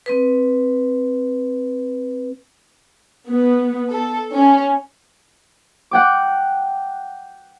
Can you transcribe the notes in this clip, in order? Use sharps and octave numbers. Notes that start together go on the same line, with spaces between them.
C4 B4
B3
A4
C#4
F#5 G5 D6